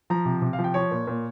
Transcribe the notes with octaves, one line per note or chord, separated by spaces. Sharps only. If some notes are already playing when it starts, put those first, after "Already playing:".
F3 A#5
C3
C3
F5
F3
G5
F3 C#5
A#2
A#2